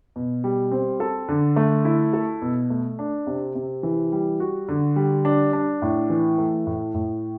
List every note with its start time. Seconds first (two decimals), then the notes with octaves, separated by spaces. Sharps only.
0.16 B2
0.44 G3
0.71 C4
1.00 A4
1.29 D3
1.56 A3
1.85 E4
2.13 A4
2.42 B2
2.70 A3
2.99 D4
3.27 C3
3.55 C3
3.83 E3
4.12 G3
4.40 F#4
4.69 D3
4.96 G3
5.25 D4
5.53 D4
5.82 A2
6.10 E3
6.38 A3
6.66 A2
6.94 A2